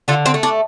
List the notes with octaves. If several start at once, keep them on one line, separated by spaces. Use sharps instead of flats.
D3 F4 A4
C4
A3
D4